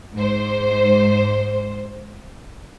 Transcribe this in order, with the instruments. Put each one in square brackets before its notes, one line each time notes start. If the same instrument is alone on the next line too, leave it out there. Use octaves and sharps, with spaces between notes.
[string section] G#2 C5